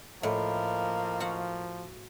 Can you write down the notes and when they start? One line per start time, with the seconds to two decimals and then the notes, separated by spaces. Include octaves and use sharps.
0.23 A2 F3 A#3 D#5 B5
1.20 F#4 F5 F#5